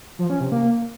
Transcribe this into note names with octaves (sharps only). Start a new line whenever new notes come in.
F3
C#4
C3
A#3